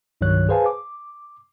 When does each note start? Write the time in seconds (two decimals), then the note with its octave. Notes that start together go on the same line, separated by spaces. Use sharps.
0.21 C2 G2 D#3 F#3 C#5 F#6
0.49 G#4 B4 C5 F5 G#5 A5
0.66 D6